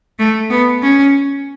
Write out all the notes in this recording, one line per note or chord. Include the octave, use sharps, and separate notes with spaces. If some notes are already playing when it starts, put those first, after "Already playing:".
A3
B3
C#4